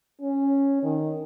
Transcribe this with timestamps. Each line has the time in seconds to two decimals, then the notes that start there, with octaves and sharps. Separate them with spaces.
0.21 C#4
0.83 D#3